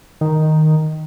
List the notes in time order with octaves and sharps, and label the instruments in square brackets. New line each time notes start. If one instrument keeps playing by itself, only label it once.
[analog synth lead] D#3